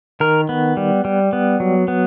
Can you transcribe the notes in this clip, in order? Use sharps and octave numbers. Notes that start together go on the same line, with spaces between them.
D#3 A#4
B3
G3
G3
B3
F#3
B3